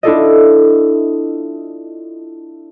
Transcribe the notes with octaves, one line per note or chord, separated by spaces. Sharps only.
D4 E4 F4 A4 D5 D#5